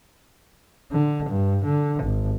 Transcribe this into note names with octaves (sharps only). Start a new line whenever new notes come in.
D3
G2
D3
G#1